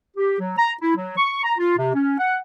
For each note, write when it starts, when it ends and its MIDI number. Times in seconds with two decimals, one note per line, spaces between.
0.16 0.38 67
0.40 0.56 54
0.57 0.72 82
0.81 0.92 64
0.96 1.14 54
1.17 1.38 85
1.43 1.53 82
1.58 1.76 65
1.77 1.92 48
1.94 2.18 61
2.18 2.37 78